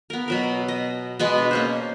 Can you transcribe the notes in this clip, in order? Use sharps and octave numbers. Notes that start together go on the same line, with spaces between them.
B3 A#4
B2 F#3 A#4
D#5
B2 G#3 B3
D4
A#3 C#4 C5